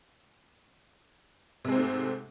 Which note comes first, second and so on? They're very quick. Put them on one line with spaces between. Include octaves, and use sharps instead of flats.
C3 G#3 C4 G#2 A3